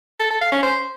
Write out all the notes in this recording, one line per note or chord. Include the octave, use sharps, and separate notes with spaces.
A4
A4
F5
C#4
C5